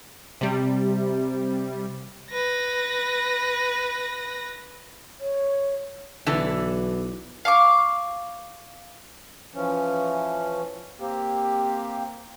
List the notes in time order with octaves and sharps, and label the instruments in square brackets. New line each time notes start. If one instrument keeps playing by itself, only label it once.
[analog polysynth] C3 G3
[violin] B4 A#6
[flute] C#5
[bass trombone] B1 [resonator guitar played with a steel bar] D3 E3 A5
[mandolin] F5 C#6 D6
[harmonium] E3 F3 C#4
A#3 C4 G4